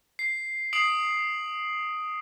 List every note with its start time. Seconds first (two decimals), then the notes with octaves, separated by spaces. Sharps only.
0.19 C7
0.73 D#6 C7 D7 F#7